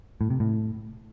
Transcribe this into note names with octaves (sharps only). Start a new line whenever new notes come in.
A2
C3
A2